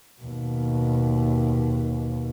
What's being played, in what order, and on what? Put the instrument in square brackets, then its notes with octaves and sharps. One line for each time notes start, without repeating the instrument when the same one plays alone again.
[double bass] D#2 B2